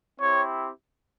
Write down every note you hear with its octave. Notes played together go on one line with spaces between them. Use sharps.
C4 E4 G4 C#5